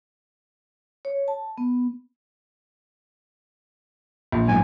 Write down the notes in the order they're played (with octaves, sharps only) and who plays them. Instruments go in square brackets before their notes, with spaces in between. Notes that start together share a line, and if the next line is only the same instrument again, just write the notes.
[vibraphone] C#5
A5
B3
[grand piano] A#1
[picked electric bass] G#2 B2 F#3 [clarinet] G#5